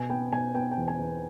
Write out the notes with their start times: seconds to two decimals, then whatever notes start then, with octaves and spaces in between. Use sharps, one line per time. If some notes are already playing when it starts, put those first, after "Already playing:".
Already playing: B2 G#5
0.10 B3 G5
0.33 B2 G#5
0.54 B3 G5
0.71 G5
0.77 E2
0.88 G#5
0.99 E2